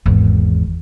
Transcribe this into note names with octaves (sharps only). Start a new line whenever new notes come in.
G#1 E2